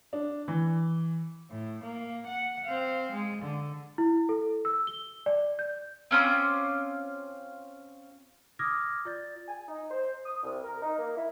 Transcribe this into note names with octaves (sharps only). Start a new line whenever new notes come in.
D4
E3
A2
A#3
F#5
C4 F5
G#3
D3
E4
A4
E6
G7
D5
G6
C4 C#4 F4 D6
D6 D#6 F6 G#6 A#6
F4 D5 A6
G#5
D#4
C5
D#6
C2
A#4
D#4
A#3
E4